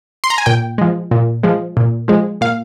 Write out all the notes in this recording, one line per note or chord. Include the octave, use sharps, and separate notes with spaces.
C6
A#5
G#5
A#2 G5
F3 G#3
A#2
F3 G#3
A#2
F3 G#3
A#2 F5